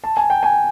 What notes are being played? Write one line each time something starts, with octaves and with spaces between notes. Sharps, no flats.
A5
G#5
G5
G#5